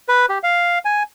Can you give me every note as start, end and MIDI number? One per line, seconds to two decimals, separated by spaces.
0.09 0.26 71
0.29 0.39 67
0.43 0.79 77
0.85 1.03 80